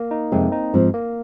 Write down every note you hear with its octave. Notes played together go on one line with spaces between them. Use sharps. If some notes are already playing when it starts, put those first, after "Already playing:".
Already playing: A#3
D#4
F2 C3 G#3 C4
D#4
G#2 F3 C4
A#3